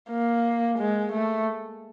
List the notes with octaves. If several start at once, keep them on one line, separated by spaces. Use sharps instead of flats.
A#3
G#3
A3